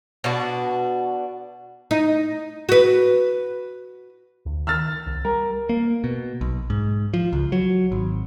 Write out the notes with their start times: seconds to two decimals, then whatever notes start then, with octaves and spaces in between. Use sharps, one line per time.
0.24 B2 D4 F#4
1.91 D#4
2.69 F#4 B4
4.46 D2
4.67 D#3 E6 F6 A6
5.06 C2
5.25 G3 A#4
5.69 A#3
6.04 B2
6.41 B1
6.70 G#2
7.14 F3
7.33 C#2
7.52 F#3
7.92 G#1